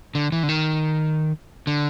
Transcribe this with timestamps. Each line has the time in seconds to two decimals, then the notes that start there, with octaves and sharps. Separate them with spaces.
0.15 D3
0.32 E3
0.43 D3
0.49 D#3
1.67 D3